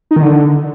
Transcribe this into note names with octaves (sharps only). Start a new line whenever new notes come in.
D#4
D#3
D3